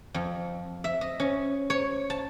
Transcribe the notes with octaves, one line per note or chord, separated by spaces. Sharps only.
F2
E5
D#5
C#4
C#5
A5